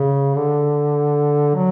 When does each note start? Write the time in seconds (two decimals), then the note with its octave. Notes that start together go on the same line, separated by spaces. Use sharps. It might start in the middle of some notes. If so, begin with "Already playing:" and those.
Already playing: C#3
0.36 D3
1.55 F#3